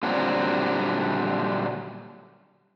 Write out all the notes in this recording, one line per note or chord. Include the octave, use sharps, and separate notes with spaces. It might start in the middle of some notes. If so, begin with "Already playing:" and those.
A#2 D3 F#3 G3 C4